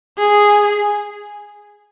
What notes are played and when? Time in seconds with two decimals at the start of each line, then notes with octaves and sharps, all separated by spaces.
0.18 G#4